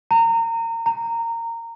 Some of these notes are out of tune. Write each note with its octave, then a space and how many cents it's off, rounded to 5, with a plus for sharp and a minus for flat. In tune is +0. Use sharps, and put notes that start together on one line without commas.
A#5 -25
A#5 -15